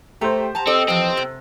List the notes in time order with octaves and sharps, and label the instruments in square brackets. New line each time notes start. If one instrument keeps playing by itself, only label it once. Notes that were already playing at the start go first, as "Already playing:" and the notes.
[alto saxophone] A3 [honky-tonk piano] G4 C5 [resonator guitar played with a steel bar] A#5
[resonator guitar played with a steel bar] A5 A#5
[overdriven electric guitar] C4 [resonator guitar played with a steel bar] A4 [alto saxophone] D#5
[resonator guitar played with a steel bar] E3 F3 [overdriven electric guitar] C4
[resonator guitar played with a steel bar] C3